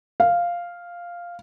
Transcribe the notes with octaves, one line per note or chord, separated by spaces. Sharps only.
F5